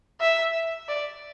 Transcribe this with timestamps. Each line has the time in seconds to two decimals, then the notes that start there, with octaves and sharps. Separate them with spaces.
0.21 E5
0.88 D5